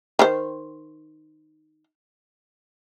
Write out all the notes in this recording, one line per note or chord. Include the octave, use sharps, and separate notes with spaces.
D#3 C5